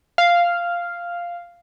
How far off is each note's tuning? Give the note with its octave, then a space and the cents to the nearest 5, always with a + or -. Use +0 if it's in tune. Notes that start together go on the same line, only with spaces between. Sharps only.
F5 -5